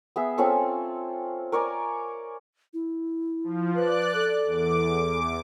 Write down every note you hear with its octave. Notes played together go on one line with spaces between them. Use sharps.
B3 G#4 E5
C4 C#4 F4 A4
A#4 C#5 D5 G#5
E4
F3
B4 D5 F#6
A4
E2 D6